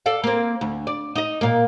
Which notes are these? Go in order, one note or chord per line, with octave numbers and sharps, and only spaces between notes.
A4 D5 F5
A#3 C4
D2
D5
D#4 D#5
A#2 A#3